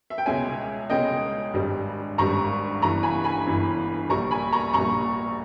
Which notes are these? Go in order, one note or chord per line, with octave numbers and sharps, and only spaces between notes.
E5
G5
C#2 B2 G#3 C#4 E5 G#5
C#2 B2 G#3 C#4 D#5 G5
G#1 G2 G3
G#1 G2 G3 A#5 C#6
G1 G2 E3 A#5 C#6
G#5 B5
G#5 B5
G1 G2 E3
A#1 A#2 G3 A#5 C#6
G#5 B5
A#5 C#6
A#1 A#2 G3 A#5 C#6